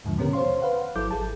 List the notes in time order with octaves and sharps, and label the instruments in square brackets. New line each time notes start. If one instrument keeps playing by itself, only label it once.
[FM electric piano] D#2 G#2 D3 F3
B2 D3 B3 C#4 G4 A#4
C5 C#5 F5 C6
B4 F5 F#5
G#1 F#3 E4 A4 D6 G6
G#1 G#4 A5